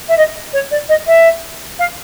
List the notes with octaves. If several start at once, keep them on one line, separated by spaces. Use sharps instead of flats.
E5
D#5
C#5
D5
D#5
E5
F5